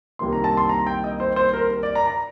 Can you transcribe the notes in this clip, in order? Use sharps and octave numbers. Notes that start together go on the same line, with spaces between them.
C2 C3 D#3 A#3 C6
A#5
A5
C6
A#5
G5
D#5
C5
C5
A#4
A#4
D5
A#5
A#5